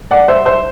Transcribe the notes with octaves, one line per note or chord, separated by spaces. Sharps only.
D5 F#5
C5 E5
C5 E5